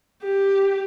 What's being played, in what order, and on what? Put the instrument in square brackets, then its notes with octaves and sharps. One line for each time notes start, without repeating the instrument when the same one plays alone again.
[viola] G4